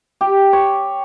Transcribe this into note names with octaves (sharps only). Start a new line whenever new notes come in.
G4
C#5